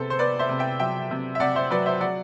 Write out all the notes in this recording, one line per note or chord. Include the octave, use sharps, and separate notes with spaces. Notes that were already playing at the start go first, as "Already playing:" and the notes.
Already playing: C3 B3 A4 C5
C5
B3 B4 D5
C5 E5
C3
E5 G5
F#3 E5 G5
C3
E5
C3 D5 F#5
C5 E5
F#3 B4 D5
C5 E5
F#3 D5 F#5